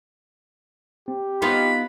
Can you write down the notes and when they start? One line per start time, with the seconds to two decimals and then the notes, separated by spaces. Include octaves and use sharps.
1.08 C4 G4
1.42 B3 D#4 F4 B5